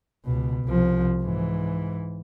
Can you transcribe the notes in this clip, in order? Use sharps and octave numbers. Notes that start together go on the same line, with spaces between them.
C#2 B2
C2 F3
G#2 E3